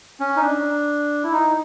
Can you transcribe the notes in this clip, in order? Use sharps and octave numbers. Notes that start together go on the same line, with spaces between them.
C#4
D#4
D4
E4
D#4